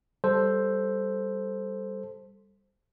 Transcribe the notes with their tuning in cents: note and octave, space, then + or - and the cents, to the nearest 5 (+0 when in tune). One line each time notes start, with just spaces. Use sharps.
G3 +0 A4 +0 C5 +0